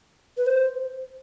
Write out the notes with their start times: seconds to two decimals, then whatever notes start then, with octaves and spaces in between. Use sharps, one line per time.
0.38 B4
0.46 C5